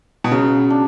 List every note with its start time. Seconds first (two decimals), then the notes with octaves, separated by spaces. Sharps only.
0.24 B2
0.31 C#3 F#3
0.70 D4